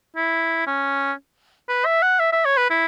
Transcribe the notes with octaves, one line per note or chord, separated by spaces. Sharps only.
E4
C#4
B4
E5
F#5
E5
E5
C#5
B4
E4